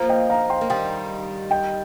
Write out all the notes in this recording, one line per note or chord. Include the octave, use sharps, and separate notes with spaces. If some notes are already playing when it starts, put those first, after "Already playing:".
Already playing: F3 A#3 F5 A#5
D#5 G5
F5 A#5
G5 C6
A#3
D#3 G3 G5 C6
D#5 G5